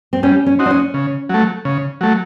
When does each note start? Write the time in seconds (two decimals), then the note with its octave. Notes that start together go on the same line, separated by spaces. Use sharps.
0.13 C4
0.23 G3 C#4
0.46 C#4
0.59 C4 D#4 F#4
0.66 D4
0.71 C#4
0.94 C#3
1.29 F#3 A3
1.65 C#3
2.01 F#3 A3